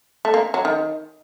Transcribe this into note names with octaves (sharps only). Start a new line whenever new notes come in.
A3
A#3
F#3
D#3